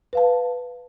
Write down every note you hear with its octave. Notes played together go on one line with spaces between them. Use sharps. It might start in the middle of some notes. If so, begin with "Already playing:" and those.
B4 F5 A5